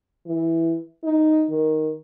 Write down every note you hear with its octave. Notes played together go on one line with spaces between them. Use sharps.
E3
D#4
D#3